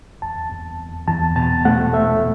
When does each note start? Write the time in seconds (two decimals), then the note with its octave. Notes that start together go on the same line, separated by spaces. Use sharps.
0.22 E2 A5
0.52 E2
0.80 E2
1.08 E2 A5
1.36 B2 A5
1.65 A3 F#5
1.93 A3 E5